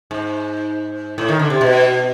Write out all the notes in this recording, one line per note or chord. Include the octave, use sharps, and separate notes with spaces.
G#2
A2
D#3
D3
C3
B2